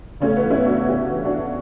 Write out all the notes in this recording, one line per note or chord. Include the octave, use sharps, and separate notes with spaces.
C#3 A3 C#4
B3
E3
C#4 E4
E2 D4 F#4
E2 E4 G4
E3
D4 F#4
E3